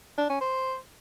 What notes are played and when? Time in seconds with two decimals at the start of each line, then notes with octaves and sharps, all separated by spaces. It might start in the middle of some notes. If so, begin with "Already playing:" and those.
0.18 D4
0.29 C#4
0.41 C5